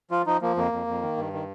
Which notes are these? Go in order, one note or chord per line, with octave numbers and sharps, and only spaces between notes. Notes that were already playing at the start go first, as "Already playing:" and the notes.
F3 F4
F3 D#4
F3 A#3
F2 A#3
F2
F2
D#3
G2
D#3